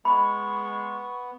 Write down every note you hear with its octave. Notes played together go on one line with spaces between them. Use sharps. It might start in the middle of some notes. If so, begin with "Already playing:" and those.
G#3 B3 B5 C#6